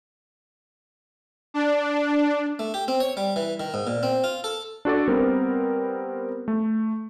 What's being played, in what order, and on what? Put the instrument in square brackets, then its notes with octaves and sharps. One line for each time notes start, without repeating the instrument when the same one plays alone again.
[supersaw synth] D4
[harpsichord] A3
G4
C4
C#5
G3
E3
D#3
G#2
A#2
C4
F4
A4
[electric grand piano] D4 F#4 A4 D5
G3 B3 C4 A#4
A3